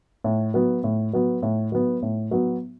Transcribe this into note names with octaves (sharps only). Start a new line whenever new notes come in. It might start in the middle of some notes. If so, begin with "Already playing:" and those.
A2
F#3 B3
A2
F#3 B3
A2
F#3 B3
A2
F#3 B3